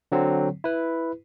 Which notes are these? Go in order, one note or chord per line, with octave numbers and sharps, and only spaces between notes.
D3 F#3 C4
E4 B4